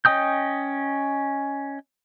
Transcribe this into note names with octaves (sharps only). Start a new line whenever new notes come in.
C#4 D#5 G5 D#6 G6